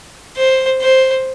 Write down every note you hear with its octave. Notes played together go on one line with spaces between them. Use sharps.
C5
C5